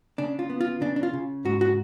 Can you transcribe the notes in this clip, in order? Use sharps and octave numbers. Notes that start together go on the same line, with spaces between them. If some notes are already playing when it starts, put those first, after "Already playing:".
C#3 D4
F4
B3
F4
C#3 D4
D4
F4
C#3
G#2 F#4
F#4